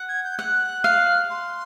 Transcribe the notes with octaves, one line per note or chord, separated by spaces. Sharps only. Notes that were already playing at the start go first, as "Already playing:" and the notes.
Already playing: F#5
G#6
G6
F#5 F#6
F5
C6